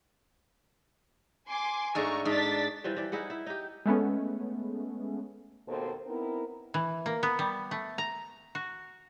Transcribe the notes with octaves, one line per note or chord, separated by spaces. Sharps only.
G#5 C6 D6
G#2 A3 D4 A#5 C#6
G#2 D4 A6 B6
E3 F3 G3
E3 D5
D#4 E4 G#4 F#5
E4
D#4 G4
G#3 A3 B3 C#4
D#2 B2 A#3 C4 A4 C5
B3 C4 D#4 E4 A#4
E3
A#3
B3
G3
A3
A#5
F#4